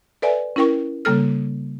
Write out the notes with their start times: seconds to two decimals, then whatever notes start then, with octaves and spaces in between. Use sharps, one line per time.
0.22 A4 B4 D5 E5 G#5
0.56 C#4 E4 A#4 G5 C#6
1.05 C#3 G3 A#3 A4 F6